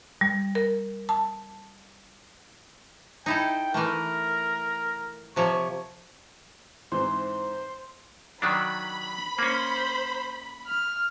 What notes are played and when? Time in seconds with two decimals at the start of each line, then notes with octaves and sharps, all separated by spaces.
0.21 G3
0.55 A#4
1.09 A5
3.26 D#4 E4 A4 G5
3.74 E3 A3 A#4
5.36 C3 F3 C#5 C#6
6.92 G#2 E3 C4 C5 C6
8.42 D#3 F#3 D4 B5
9.39 A#3 C#4 C5
10.67 F6